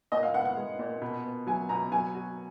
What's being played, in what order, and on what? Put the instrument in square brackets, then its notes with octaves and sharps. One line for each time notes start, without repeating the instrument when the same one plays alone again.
[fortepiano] A#2 [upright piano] D#5
[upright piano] F5
[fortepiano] B3 [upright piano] F#5
[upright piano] F#5
[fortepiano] G#3
A#2
B2
B3
[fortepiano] F#3 [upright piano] G#5
[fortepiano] B2 [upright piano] A#5
[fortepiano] F#3 [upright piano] G#5
[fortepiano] F#4